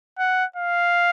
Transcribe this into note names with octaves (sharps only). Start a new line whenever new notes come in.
F#5
F5